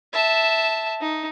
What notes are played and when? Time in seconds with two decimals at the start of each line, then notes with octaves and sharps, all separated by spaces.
0.13 E5 A5
1.01 D#4